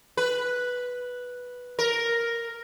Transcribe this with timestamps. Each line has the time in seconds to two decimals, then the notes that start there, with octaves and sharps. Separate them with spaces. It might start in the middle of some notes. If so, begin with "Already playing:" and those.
0.17 B4
1.79 A#4